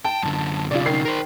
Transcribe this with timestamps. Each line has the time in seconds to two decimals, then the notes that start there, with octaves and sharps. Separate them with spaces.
0.05 G5 A5
0.23 F#2 D3
0.71 B1 C#3 F4 D5
0.85 D#3 C7
1.05 A#4 C5